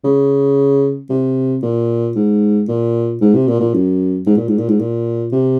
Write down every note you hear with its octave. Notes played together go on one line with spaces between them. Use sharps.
C#3
C3
A#2
G#2
A#2
G#2
C3
A#2
A#2
F#2
G#2
A#2
G#2
A#2
G#2
A#2
C3